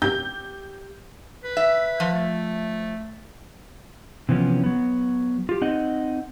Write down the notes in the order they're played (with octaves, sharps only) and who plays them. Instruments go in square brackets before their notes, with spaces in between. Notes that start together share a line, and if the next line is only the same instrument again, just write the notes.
[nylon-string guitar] G4 [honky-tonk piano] G6
[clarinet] B4
[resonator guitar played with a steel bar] E5
F3
[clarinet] A3
[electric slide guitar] C3 E3 F3 B3 C#4
F#3 B3
F4 G4
C4 D#4 D#5 F#5